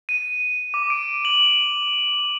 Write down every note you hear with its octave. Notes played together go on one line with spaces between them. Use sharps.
D#7
D6
D7
F#7